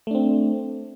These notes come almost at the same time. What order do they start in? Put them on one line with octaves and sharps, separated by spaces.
A3 D4 C4